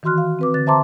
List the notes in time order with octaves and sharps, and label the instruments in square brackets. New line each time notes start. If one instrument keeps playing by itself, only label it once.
[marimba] D#3 E3 F#4 C6 F6 F#6
F5
C4 B4 D6
D3 A6
C5 E5 A5 A#5 C6 D6